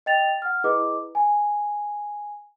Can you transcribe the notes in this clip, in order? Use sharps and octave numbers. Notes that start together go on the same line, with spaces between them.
D#5 G5 A6 F7
F#5 F6
E4 G#4 B4 D#5 D6
G#5